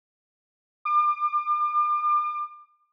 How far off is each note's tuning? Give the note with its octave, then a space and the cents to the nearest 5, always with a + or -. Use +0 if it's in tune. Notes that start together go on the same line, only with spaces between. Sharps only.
D6 +40